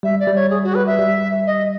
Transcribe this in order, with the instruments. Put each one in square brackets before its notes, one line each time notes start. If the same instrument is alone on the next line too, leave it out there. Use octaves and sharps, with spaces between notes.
[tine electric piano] G3 [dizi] E5
[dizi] D5
[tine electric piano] G3
[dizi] C#5
G#4
F#4
B4
E5
[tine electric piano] G3
[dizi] D#5